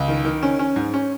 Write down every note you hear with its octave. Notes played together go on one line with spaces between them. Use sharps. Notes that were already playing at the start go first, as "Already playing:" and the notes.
Already playing: C#2
D#3
D#3
C#4
C#4
G#2
C#4